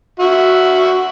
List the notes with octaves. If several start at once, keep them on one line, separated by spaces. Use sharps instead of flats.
F#4 E5